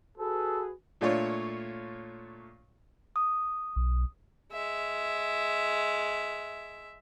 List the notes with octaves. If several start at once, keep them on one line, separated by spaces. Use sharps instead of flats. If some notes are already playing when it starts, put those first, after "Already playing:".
F#4 G#4 A4 B4
A#2 A3 D4 F4 C#5
D#6
B1
G#3 E5